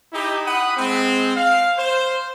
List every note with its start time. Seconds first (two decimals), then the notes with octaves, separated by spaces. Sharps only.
0.12 D#4 E4 G4
0.45 F#5 B5 D#6
0.77 G#3 C4
1.36 F5
1.78 C5